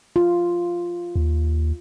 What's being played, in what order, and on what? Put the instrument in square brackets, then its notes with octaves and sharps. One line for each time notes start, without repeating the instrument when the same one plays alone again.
[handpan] F4
[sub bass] D#2